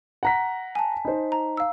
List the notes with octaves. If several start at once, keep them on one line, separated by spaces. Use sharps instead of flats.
F#5 A#5 B6
G#5 A5
D#4 C5
A#5
F5 E6